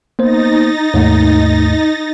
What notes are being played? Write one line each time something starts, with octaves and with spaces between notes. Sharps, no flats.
A#3 B3 D#4 C5 A6 A#6
D#2 G#2 A3